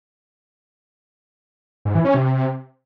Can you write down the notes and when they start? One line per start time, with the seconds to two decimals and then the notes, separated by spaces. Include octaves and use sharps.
1.85 G#2
1.95 E3
2.05 C#4
2.14 C3